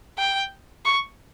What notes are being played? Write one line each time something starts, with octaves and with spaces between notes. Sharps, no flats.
G5
C#6